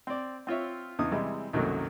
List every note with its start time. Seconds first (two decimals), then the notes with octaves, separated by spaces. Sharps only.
0.07 C4 D5
0.47 C4 F4 C#5 E5
0.99 E2 C#3 D#4 D#6
1.12 C3 E3 G3 G#3
1.53 C2 F#2 D#3 F#3 A3 A#3